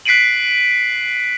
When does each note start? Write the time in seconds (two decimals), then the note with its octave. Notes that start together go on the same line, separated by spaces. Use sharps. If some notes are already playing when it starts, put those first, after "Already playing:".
0.05 F#6 B6 C7 D7 D#7 F#7